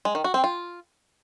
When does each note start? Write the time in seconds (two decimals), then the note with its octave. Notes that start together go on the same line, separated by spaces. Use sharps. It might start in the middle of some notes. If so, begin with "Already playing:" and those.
0.05 G#3
0.15 D#3
0.24 F#4
0.34 C4
0.44 F4